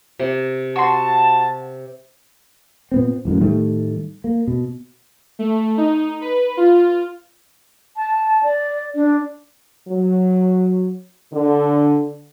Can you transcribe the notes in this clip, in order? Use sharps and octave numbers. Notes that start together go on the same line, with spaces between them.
C3
F#4 A5 C6
A#2 B3 C4
D1 F#2 A2
A2 D#3 G3 A3
A#3
B2
A3
D#4
B4
F4
A5
D5
D4
F#3
D3